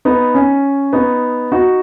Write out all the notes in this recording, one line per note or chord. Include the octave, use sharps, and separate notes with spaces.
B3 D#4
C#4
B3 D#4
D#4 F#4